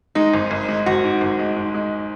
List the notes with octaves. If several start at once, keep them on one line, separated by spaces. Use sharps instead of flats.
G#3 D#4
G#1
G#1
G#3
G#1 F#4
G#2
G#1
G#3
G#2
G#3